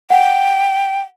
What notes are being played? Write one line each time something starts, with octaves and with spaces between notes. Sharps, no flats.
F#5 G5